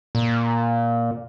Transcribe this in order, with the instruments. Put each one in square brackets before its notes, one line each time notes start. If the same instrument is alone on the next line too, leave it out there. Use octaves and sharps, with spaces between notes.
[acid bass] A#2